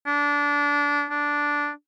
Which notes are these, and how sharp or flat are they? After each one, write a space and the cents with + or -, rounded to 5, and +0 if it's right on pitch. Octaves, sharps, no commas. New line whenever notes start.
D4 -20
D4 -5